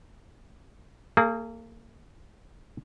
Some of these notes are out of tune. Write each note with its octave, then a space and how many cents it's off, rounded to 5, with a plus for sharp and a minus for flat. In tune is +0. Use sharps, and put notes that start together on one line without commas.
A#3 -30 G#4 +20